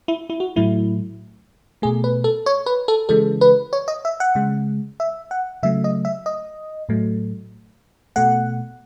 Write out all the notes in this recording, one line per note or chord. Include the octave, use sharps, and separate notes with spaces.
E4
E4
F#4
A2 F#3 A3 E4
B2 A3 G#4
B4
A4
C#5
B4
A4
C#3 E3 G#3 A4
B4
C#5
D#5
E5
F#5
C#3 G#3
E5
F#5
C#3 F#3 A3 E5
D#5
E5
D#5
A2 F#3 A3
B2 A3 F#5